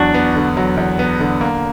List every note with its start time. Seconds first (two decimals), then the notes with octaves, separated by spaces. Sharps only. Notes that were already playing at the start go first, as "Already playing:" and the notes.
Already playing: E2 F#3 D4 F#4
0.14 B3
0.36 D3
0.57 F#3
0.77 E2
0.99 B3
1.20 D3
1.41 A#3